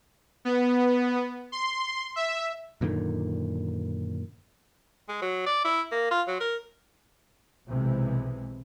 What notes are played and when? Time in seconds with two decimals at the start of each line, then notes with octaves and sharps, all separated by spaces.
0.45 B3
1.52 C6
2.16 E5
2.81 F#2 A#2 D3 D#3
5.09 G#3
5.21 F#3
5.46 D5
5.64 E4
5.91 A#3
6.11 F4
6.27 F#3
6.40 A#4
7.68 B1 C3 E3 G#3